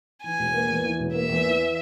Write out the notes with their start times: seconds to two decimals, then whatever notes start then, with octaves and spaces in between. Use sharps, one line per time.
0.23 E3 G#5
0.39 E1
0.54 A#3
0.68 E2
0.84 E3
0.99 E1
1.14 A#3 E5
1.29 E2
1.45 E3